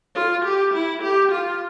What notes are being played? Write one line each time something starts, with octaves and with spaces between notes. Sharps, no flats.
F4
G4
E4
G4
F4